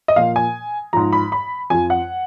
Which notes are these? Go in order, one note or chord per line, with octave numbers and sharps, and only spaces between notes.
D#5
A#2 F3 F5
G#5
G#2 F3 A#5
B5
B5
F2 F3 G#5
F#5